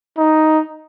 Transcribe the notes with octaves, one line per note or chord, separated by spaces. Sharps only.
D#4